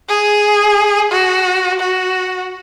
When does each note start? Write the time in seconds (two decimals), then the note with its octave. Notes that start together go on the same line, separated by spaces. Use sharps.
0.09 G#4
1.11 F#4
1.80 F#4